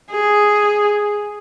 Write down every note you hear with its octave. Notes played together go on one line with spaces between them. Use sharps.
G#4